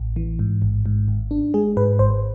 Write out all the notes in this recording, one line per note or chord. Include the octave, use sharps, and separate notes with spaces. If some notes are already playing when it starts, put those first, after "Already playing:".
Already playing: A1
E3
G#2
A1
G#2
G#1
D4
G#3 G#4
G#2 B4
G#1 C5